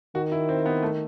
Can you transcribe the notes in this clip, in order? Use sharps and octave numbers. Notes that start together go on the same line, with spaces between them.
D#3 F#4
E4
C4
B3
A3